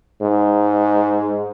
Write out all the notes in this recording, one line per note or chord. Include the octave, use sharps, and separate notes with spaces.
G#2